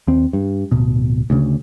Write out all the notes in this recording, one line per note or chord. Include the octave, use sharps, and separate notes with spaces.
D#2 C4
G2
D1 B2
D2 C#3